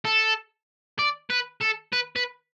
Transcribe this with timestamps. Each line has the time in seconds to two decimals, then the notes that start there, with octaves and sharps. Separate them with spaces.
0.05 A4
0.99 D5
1.30 B4
1.61 A4
1.93 B4
2.16 B4